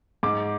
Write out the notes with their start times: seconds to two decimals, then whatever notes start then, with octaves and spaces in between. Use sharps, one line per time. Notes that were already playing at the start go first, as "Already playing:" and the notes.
0.23 G#2 D6